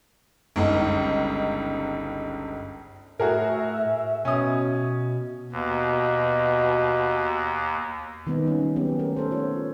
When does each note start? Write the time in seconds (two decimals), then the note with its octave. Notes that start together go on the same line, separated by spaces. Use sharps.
0.56 G1 C#2 D#4
3.20 A2 F#4 G#4 A#4 E5
4.25 B2 C#4 D#6
5.52 D#2 B2
8.27 D#3 G3 A#3 B3 D#4
8.47 G3 C#4
8.76 F#3 B3 C#4 G4
8.99 A3 C#4 A#4
9.17 A4 C5
9.31 F4 C5 C#5